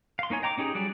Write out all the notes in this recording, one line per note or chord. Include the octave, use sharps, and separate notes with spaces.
F5 C6
A#3 D#4 C#5 G#5
D#5 G5 A#5 C#6 D6
C#4 D#4 G4 G#4
F#3 G3 G#4 D5